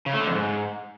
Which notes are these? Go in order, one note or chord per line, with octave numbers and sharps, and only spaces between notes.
C#3
A3
D3
F2
G#2